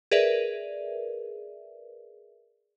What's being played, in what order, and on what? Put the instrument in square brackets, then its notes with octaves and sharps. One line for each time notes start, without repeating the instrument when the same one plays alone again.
[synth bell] G#4 A#4 B4 D5 E5